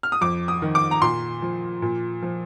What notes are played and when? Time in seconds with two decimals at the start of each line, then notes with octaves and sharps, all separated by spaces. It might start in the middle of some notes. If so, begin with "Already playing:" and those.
0.03 F6
0.12 D#6
0.21 F2 D6
0.48 D#6
0.62 D#3
0.75 D6
0.91 A#5
1.02 A#2 C6
1.42 F3
1.82 A#2
2.22 F3